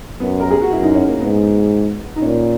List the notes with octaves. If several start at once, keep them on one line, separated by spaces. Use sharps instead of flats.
F#2 B3
A#4
G#4
F#4
F#2 E4
D#4
C#4
A#3
G#2 B3
D#4
A#2 C#4